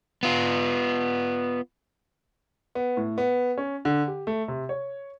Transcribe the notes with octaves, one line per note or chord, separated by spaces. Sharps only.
B3 F4
B3
A2
B3
C#4
D3
G4
A3
C3
C#5